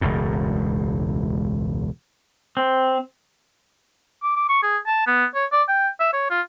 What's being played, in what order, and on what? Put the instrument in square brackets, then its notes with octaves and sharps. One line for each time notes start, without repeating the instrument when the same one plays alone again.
[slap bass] E1 C#2 F#2 A2
[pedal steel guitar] C4
[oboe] D6
D6
C#6
G#4
A5
B3
C#5
D5
G5
E5
C#5
F4